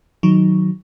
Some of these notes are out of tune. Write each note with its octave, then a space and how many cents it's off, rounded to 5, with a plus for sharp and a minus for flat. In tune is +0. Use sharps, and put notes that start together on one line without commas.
D#3 +0 F#3 +0 D#4 +0